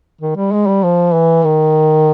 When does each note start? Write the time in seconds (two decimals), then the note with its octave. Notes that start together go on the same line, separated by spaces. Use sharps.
0.22 D#3
0.36 G3
0.52 G#3
0.67 G3
0.84 F3
1.14 E3
1.44 D#3